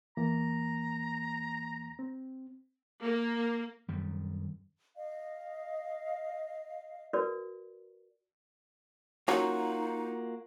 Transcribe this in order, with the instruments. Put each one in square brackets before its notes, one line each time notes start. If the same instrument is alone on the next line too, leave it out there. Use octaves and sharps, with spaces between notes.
[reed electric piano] E2 E3 A#3 [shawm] A#5
[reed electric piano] C4
[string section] A#3
[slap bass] F#2 D#3 G3
[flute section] D#5 F5
[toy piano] F#4 A#4 B4 D5
[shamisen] F#3 C#4 [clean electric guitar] A#3 F4 F#4 [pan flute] D#4